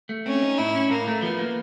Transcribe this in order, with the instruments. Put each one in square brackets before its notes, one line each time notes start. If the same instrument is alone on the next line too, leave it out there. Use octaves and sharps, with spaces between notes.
[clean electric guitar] A3
[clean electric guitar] C4 [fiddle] C#4
[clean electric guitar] D#4
[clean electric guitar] A2 [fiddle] E4
[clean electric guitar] C#4
[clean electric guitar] A2 [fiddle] A#3
[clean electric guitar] A3
[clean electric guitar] F3 [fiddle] B3
[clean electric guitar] A#3